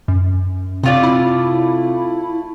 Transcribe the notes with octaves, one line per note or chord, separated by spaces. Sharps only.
F#2
C3 A3 F4 D5
E4